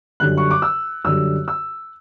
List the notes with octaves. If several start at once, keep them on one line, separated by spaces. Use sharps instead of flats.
F#2 D3 G3 F#6
C#6
D6
E6
F#2 D3 G3 E6
E6